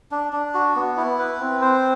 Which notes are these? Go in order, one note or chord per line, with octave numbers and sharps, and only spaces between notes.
D4
D4
F#4
B3
E4
B4
C4
C5